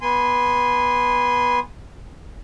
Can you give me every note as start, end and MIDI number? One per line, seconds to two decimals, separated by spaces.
0.01 1.59 59
0.01 1.59 80
0.01 1.59 84